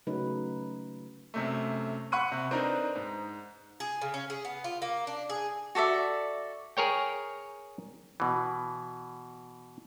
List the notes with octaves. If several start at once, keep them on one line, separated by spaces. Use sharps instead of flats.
C#3 F#3 A3 D#4 B4
F#2 C3 A3
F#5 B5 C#6 F#6 D#7
C3
C4 D4 D#4 A#4 B4
G#2
G#4
C#3
C#4
G#4
B3
F4
A#3
D4
G#4
F#4 A4 D5 E5
G#4 A#4 C#5 G5
B2 E3